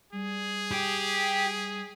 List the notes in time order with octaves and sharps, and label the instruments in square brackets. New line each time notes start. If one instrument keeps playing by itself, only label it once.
[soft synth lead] G3 [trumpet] G#4
[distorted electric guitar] G4